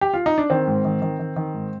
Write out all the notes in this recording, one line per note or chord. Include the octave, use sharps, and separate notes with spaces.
G4
F4
D#4
D4
D#3 C4
G#2
D#3
D#3
D#3
D#3
G#2